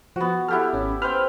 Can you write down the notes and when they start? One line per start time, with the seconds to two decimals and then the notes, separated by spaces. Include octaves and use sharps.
0.16 F3 B3 F#4
0.48 E4 G4 A4 F#5 F6
0.73 G#1 C#4
1.02 B4 C5 G5 F6